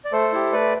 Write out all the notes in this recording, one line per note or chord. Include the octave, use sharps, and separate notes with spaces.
D5
A3 A4 C5
E4 G4
A3 B4 D5